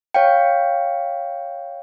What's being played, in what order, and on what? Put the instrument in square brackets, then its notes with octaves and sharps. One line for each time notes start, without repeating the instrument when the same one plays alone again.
[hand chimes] C#5 F5 G5